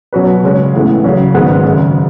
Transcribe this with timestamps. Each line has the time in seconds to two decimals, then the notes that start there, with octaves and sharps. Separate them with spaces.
0.13 B2 F#3 C#4 F#4 B4
0.43 C#3 G#3 C#4
0.74 A1 A2 E3 B3
1.04 C#3 F#3 C#4 F#4
1.34 G#1 G#2 D#3 G#3 B3
1.65 G#1 F#2 C#3